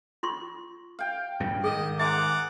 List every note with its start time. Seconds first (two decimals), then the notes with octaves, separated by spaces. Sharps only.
0.23 F4 C6 C#6
0.99 F5 G5
1.40 G2 A#2 C#3
1.64 G#2 D#3 G#4 D#5
1.99 G#4 C5 E5 F#5 A#5 D6